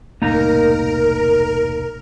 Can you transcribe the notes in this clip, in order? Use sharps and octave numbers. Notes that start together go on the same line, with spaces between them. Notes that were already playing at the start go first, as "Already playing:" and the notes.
E1 C2 A2 A#3 D#4 A#4 A#5